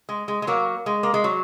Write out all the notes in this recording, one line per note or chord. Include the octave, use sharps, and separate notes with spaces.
G#3
G#3
G#3
F#3 A#3
G#3
A#3
G#3
F#3